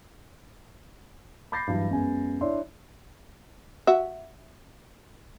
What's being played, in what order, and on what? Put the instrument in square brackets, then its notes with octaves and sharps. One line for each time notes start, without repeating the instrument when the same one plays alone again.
[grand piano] B5 D6 G6 A6 A#6 C7
G2 E3 F#3
F#2 G#3 B3 G#5
D4 E4 C#5 D5 E5 C6
[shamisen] F#4 E5